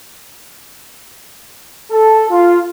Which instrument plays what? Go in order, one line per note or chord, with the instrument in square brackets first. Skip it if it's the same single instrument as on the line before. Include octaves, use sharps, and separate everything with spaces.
[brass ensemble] A4
F4